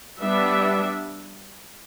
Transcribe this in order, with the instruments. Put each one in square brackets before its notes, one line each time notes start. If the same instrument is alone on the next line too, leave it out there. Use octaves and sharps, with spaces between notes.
[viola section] G3 B3 D4 E5